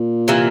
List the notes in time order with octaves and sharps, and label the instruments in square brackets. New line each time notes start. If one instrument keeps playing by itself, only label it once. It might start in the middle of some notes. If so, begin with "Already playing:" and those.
Already playing: [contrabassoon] A#2
[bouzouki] C3 E3 A#3